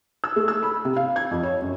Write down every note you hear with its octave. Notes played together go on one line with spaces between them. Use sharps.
E6
A3
E6
B5
C3
F5
G#6
F2
C#5
F#2